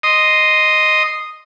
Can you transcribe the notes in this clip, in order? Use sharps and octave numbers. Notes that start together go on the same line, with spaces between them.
D#5 C6 D#6